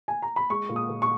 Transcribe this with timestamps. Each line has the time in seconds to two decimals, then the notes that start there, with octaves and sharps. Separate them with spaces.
0.08 G#5
0.22 A#5
0.36 B5
0.50 G#3 C#6
0.69 A#2
0.76 D#6
0.89 A#2
1.02 C#6